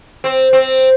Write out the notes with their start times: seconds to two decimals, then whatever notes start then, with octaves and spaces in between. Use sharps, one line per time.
0.24 C4
0.53 C4